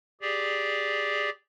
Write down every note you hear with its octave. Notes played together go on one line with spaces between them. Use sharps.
G4 G#4 D5